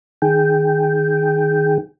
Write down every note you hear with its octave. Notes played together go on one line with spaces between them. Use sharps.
D#3 G#4 G5